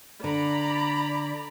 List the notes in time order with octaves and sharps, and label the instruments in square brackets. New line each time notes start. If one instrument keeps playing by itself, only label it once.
[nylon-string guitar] D3 [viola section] D5 A#5 B5